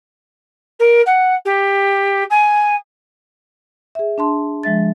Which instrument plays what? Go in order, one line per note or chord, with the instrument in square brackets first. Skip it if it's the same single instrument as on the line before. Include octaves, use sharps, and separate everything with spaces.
[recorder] A#4
F#5
G4
G#5
[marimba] G#4 E5
D4 A5 C6
F3 G#3 E5 A6